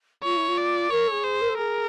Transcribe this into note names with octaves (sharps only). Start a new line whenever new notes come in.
F4 C#5
E4
F4
D5
A#4 C#5
A4
G#4
C5
A#4
A4
G#4 A#4